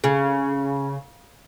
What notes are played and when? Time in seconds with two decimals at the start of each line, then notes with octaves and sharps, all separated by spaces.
0.04 C#3